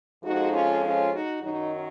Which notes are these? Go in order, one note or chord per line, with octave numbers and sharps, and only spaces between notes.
F2 F3 G#3 D#4 F#4
C#4 F4
C#4 F4
D#4 F#4
F#2 D#3 F#3 D#4 F#4